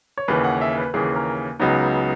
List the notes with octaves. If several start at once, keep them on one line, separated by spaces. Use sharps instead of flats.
C#5
D#2 C#3 E3 B4
F#5
E5
B4
D#2 C#3 E3 G#4
A#4
C#2 C#3 F#3 B3 D#4